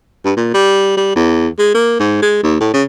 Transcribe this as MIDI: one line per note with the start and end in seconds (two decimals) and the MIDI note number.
0.24 0.33 43
0.37 0.51 46
0.54 0.93 55
0.97 1.14 55
1.15 1.48 40
1.59 1.73 56
1.74 1.99 58
2.00 2.22 44
2.22 2.39 56
2.43 2.56 39
2.60 2.73 45
2.73 2.83 49